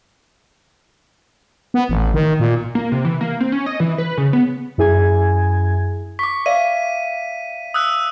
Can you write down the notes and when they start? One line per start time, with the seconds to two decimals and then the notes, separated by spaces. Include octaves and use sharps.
1.74 B3
1.89 A1
2.14 D#3
2.40 A#2
2.75 A#3
2.92 C3
3.05 E3
3.21 A#3
3.40 C4
3.52 C#4
3.66 D#5
3.80 E3
3.98 B4
4.18 C#3
4.33 B3
4.78 F#2 E4 G#4 G#5 G#6
6.19 C#6 D6 B6
6.46 D5 E5 F5 D#7
7.74 D#6 E6 F#6